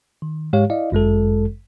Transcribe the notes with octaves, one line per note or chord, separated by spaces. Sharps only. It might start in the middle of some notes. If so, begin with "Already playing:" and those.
D#3
G#2 G#3 G4 C#5 F5
E4 D5 D#5 F5
G1 F#2 G#3 A4